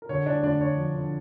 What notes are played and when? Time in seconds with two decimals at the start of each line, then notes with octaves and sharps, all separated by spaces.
0.02 A#4
0.09 D3 C#5
0.26 D3 D4 D5
0.43 D3 D4 D5
0.60 D3 C#5
0.78 F3
0.95 D3